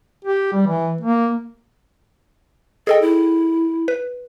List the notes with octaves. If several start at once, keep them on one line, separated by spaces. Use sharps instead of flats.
G4
G3
E3
A#3
G#4 A4 D#5 G5
E4
B4